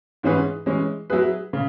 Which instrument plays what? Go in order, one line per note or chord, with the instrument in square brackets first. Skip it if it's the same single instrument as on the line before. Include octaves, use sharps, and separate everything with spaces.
[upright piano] G#2 E3 C#4 G#4 B4
E3 G#3 C#4
F#3 E4 G#4 B4
C#3